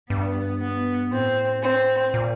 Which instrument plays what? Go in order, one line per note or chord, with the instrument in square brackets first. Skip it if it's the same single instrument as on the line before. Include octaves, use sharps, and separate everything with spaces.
[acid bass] G2 [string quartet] B3
[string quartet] B3
[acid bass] A2 [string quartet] C4
[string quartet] C4
[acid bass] A#2